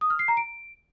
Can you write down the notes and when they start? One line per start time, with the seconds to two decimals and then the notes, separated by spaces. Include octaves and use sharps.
0.01 D#6
0.10 F6
0.19 C7
0.28 A#5
0.37 D7